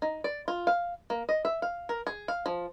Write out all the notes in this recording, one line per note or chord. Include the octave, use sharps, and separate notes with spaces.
D#4
D5
F4
F5
A#3
D#5
E5
F5
A#4
G#4
F5
F3